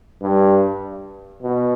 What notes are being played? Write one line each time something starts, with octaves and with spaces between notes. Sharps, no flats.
G2
B2